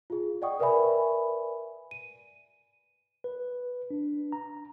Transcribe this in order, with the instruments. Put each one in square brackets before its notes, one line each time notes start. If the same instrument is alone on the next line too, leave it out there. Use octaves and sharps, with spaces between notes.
[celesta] F4 G#4
D5 D#5 F#5 G5 C#6 D#6
A#4 B4 D5 E5 G#5 B5
D#7
[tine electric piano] B4
D4
A#5